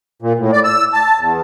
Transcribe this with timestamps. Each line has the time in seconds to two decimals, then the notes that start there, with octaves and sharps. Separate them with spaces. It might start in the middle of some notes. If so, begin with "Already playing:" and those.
0.22 A#2
0.39 A2
0.53 D5
0.64 E6
0.93 A5
1.19 E2